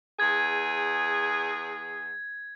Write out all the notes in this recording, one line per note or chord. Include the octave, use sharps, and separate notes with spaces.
E2 G#4 G#6